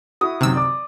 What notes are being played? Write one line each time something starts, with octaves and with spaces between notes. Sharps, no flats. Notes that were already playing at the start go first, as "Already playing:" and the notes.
E4 F#4 D#6
F#2 C3 D#3 E6
D5 D6